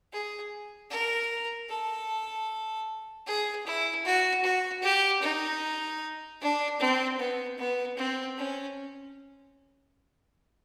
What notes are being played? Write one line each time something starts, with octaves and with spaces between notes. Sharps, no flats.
G#4
A#4
A4
G#4
E4
F#4
F#4
G4
D#4
D4
C4
B3
B3
C4
C#4